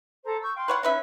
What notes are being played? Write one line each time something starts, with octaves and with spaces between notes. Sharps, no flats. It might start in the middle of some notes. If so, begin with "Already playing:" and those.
A4 C5 A#5
C#6 E6 G6
F5 G5 C6
B4 C#5 F#5
C#4 D#4 B4 E5 F#6